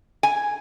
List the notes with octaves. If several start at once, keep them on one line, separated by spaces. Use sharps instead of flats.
G#5